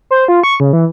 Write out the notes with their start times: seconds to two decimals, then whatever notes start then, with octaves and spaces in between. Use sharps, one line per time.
0.11 C5
0.28 F4
0.44 C#6
0.60 C#3
0.73 E3